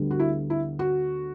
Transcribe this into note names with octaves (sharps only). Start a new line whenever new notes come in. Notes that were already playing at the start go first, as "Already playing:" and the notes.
Already playing: D2 D3 G3 B3
F#4
E4
E4
F#4